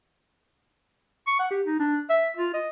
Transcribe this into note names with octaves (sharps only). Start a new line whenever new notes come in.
C#6
F#5
G4
D#4
D4
E5
F4
D#5